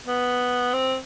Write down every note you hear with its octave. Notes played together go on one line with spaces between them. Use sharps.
B3
C4